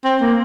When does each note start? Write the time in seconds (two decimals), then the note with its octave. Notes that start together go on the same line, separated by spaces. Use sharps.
0.04 C4
0.21 A#3